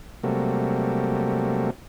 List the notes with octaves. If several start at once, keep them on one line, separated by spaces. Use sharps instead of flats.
C3 F#3 G3 A3 A#3